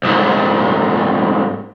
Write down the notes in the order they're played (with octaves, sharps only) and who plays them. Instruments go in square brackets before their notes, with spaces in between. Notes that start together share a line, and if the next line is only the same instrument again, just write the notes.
[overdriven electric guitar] C2 G#2